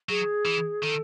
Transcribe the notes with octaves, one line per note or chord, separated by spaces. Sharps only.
F#3 G#4
E3
D#3 A4